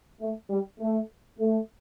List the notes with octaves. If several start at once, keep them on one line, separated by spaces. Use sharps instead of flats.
A3
G3
A3
A3